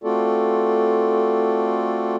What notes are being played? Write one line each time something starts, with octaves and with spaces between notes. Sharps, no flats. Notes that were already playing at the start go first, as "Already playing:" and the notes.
A3 C4 F4 F#4 A4 D5